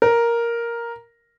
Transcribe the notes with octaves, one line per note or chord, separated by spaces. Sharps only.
A#4